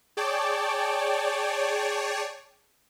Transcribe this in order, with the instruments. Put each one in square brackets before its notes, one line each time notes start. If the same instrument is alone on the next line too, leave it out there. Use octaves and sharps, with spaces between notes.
[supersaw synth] G#4 C#5 D5 G5 A5 D6